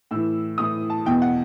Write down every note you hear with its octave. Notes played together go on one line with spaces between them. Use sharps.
A2 E3 E6
A2 E3 D#6
A5
E2 B2 G5
F#5